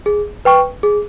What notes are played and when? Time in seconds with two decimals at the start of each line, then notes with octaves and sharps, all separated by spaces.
0.06 G#4
0.45 B4 G5 C#6
0.83 G#4